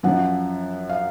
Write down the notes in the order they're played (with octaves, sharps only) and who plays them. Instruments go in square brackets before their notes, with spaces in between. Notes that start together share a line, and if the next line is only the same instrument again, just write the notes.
[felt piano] F#2 F3 F#5
F5